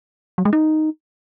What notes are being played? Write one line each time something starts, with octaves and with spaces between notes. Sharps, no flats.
F#3
G#3
D#4